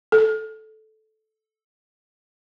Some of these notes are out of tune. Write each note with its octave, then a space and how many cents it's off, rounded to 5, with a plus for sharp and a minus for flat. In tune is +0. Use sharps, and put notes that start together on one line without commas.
A4 -10